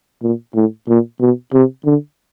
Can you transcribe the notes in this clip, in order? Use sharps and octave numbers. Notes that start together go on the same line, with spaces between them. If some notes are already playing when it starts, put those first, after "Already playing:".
A#2
A2
A#2
B2
C3
D3